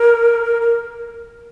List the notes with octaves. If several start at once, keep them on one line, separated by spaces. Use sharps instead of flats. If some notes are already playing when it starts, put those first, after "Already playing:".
Already playing: A#4
A#4
A#4